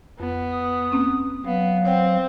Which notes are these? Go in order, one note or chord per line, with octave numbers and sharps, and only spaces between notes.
F2 B3
D#6
A#3 C4 C#4
F#3 B3 F5
C4 C#5 F#5 G5